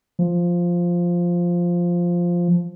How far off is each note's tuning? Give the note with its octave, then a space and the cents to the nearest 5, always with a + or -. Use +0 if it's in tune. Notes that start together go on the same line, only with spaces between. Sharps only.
F3 +0